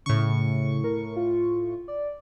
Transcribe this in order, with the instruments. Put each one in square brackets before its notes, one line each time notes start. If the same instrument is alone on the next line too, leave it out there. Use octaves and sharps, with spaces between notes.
[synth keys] A2 C#6 [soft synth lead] C#3
[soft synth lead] A#4
F4
D5